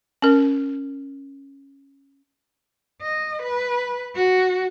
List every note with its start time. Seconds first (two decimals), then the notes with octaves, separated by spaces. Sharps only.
0.22 C#4 A#4
3.02 D#5
3.43 B4
4.15 F#4